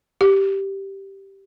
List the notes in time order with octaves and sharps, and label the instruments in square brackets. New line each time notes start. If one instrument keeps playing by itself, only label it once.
[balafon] G4